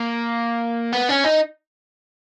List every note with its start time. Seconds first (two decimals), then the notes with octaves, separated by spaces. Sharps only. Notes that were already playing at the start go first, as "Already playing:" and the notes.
Already playing: A#3
0.93 B3
1.09 C#4
1.24 D#4